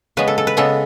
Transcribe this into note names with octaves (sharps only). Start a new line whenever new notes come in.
C#3 G#3 B3 B4
A4
A4
B4
C#3 G#3 B3 A4